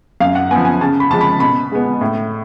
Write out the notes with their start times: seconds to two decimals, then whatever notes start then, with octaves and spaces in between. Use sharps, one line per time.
0.20 F#2 F5
0.35 F#5
0.51 B3 G#5
0.55 F3
0.65 G#5
0.81 C#3 A5
1.00 B5
1.11 F3 G#3 A5
1.21 B5
1.40 B2 B5
1.72 G#3 B3
2.01 A2